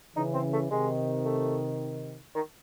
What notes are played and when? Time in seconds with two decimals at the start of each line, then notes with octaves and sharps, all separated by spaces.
0.16 C#3 E3 D#4
0.34 C4
0.53 A3
0.71 C3 D#3 G#3
1.25 A3
2.35 D#3